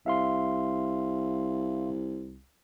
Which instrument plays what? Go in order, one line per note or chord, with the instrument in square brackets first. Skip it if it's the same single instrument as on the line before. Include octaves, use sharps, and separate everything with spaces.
[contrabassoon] C2 [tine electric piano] E5 F5 C6